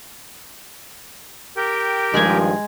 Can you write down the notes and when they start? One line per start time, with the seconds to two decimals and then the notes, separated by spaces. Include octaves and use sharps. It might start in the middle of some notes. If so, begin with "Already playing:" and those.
1.56 G4 A#4 G5
2.14 G2 D#3 F3 G#3 G#4 G#5